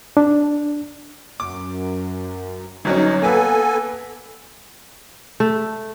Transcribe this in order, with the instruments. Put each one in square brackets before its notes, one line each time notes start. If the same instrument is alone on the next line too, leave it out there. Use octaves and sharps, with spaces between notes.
[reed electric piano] D4
[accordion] F#2 [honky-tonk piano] D6
[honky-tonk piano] G1 F#3 C#4 [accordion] D#4
[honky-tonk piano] A#3 B4 [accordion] B3 A4 G#5
[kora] A3